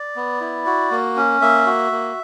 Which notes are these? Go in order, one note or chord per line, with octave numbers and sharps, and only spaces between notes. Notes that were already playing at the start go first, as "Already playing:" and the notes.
Already playing: D5
B3
E4
F#4
A#3
C#4
A#3 E5
F#4
A#3